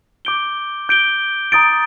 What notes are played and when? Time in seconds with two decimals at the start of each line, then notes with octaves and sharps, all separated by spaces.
0.25 D6 G6 D7 G7
0.89 G6 D7 G7
1.52 A#5 D#6 A6 D7